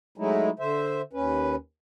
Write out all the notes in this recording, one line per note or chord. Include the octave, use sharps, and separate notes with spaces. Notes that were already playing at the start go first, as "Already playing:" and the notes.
F#3 G#3 A3 D#4 E4
D3 C5 E5
D#2 C#4 B4